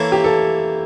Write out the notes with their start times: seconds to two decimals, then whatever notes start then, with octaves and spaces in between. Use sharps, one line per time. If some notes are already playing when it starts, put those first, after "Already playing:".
Already playing: E3 A#3 E4 A4 C#5
0.12 G4
0.24 A4